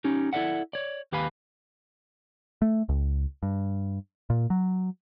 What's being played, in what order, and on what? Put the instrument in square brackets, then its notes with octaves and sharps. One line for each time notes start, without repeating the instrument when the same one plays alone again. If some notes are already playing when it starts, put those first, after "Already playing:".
[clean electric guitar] C#4 D#4 G4
E4 A4 D5 E5 F#5
C#5 D5
D#2 G4 B4 F5 G#5 B5
[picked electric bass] A3
C#2
G2
A#2
F#3